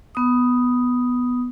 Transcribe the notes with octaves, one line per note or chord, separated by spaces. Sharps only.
B3 D#6